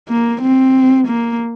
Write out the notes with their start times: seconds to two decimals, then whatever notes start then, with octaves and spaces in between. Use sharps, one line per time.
0.09 A#3
0.42 C4
1.07 A#3